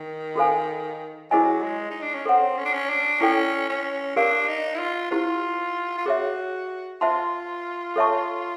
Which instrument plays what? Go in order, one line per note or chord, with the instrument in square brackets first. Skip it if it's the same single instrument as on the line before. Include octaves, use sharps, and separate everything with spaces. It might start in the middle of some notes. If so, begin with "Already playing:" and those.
Already playing: [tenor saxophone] D#3
[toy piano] F#4 A4 C5 F5 G#5
[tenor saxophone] F#3 [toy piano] E4 G#4 C5 D#5 G#5
[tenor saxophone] G#3
D#4
D4
C#4
[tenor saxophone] C4 [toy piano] A4 C#5 F#5
[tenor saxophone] C#4
D4
C#4
D4
[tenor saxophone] C#4 [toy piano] E4 A4 D5 G5
[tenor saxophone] C#4
[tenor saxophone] D4 [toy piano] G4 A#4 D5 F5
[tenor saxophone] D#4
E4
F4
[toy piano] E4 G4 C5 [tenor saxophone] F4
[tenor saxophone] F4
[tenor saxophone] F#4 [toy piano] G#4 C#5 E5
[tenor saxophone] F4 [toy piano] C5 E5 A5 C6
[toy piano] A4 C#5 E5 A5 C#6